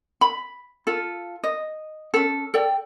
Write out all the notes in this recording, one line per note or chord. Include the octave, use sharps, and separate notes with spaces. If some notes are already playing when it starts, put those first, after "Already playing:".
B5
F4 A4
D#5
C#4 A4
A4 D5 G5